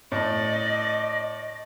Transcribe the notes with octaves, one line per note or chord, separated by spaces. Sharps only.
A2 D5 D#5